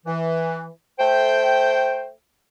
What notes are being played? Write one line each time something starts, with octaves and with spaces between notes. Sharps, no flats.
E3
A3 C5 G5